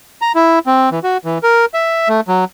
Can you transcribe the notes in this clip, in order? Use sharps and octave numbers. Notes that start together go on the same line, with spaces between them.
A#5
E4
C4
E3
F#4
E3
A#4
E5
A3
F#3